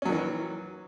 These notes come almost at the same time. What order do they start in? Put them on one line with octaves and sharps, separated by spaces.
C#4 F#3 D#3 E3